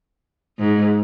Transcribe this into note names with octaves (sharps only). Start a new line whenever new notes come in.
G#2